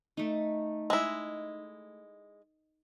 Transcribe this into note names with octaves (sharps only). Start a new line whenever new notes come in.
A3 D#4
G#3 E4 D#5